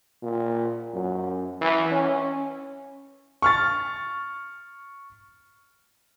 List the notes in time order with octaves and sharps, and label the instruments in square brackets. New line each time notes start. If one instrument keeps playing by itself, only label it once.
[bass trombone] A#2
F#2
E3
C#4
[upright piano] C#6 F6 A6